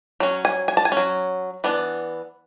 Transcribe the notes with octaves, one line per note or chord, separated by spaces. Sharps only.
F#3 C#4
G#5
G#5
A5
G#5
C#4
F#3
E3 B3 D4